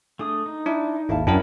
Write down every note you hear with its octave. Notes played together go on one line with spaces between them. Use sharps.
A3 D4 G#4 D#6
D#4
D4 E4 D5
G#1 D#2 E4 F5 A5
F#2 D4 E4 G#4 A#4 G5 A5